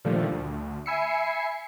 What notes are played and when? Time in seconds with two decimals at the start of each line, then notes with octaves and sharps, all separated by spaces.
0.05 A#2 D3 D#3 F3 G3 A3
0.31 D2
0.86 E5 G#5 B5 E6 C7 C#7